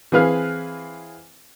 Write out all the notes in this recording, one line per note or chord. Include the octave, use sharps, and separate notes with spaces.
E3 C4 G#4 B4 F5 F6